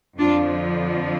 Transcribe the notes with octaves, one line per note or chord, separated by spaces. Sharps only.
F2 D3 F3 D4 F4